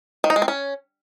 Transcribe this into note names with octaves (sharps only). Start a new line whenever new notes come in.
D#3
D#4
G#3
C4
C#4